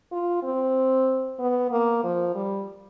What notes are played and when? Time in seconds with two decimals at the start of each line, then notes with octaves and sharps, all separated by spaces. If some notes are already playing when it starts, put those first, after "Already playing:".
0.12 F4
0.43 C4
1.39 B3
1.71 A#3
2.04 F3
2.35 G3